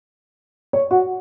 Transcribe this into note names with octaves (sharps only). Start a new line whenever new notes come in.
C#5
F#4